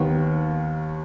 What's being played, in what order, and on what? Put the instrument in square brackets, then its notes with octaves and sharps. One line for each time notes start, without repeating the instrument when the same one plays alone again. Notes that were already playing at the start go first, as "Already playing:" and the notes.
Already playing: [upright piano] D#2 D#3 B3